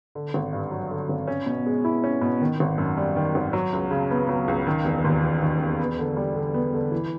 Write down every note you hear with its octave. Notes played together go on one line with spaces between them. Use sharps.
D3
G#1
G2
F#3
D3
G#1
C#4
B2
G#3
E4
C#4
B2
D#3
G#1
F#2
G3
D#3
G#1
F#3
C#2
C#3
B3
F#3
C#2
D#3
E1
D#2
E1
D#3
E1
B3
D3
G3
D3
B3
D3
E3